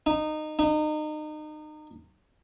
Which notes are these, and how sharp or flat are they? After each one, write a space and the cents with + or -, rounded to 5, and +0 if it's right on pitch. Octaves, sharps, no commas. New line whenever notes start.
D#4 -20
D#4 -30